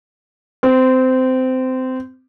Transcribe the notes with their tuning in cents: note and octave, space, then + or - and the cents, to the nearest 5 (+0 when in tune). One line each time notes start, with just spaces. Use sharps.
C4 -20